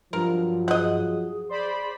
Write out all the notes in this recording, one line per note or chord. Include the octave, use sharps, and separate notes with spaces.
G2 F3 F#3 A#4
G#4 D#5 F#5
C5 D5 B5